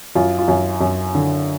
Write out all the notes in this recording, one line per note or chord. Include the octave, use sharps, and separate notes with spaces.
F#2 F4
F4
F#2
F#2
D3